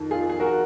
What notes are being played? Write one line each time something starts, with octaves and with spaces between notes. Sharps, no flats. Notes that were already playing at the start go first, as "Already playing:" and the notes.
Already playing: F2 D#3
F4 G#4
G#4
F#4 A#4